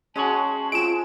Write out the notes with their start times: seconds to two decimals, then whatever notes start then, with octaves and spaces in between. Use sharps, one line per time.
0.16 G#3 C#4 F#4 G#4 C#5 A5
0.72 G#3 C4 F4 D7 E7